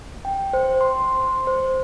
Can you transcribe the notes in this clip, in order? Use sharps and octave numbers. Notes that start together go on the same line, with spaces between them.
G5
C5
C6
C5